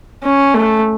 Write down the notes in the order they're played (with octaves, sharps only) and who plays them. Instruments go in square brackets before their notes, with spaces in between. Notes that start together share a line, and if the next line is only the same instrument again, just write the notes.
[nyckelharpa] C#4
A3